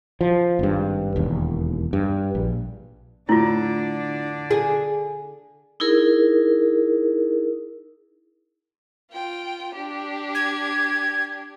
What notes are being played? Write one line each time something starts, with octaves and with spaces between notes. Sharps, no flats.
F3
G#1 G2
E1 D#2
G2
A#1
A2 D3 D4 E4 F4
G#4
D#4 E4 G#4 A#4
F4 G5
D4 G4
G#6